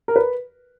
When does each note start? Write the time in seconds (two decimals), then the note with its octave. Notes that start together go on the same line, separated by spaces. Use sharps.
0.08 A#4
0.16 B4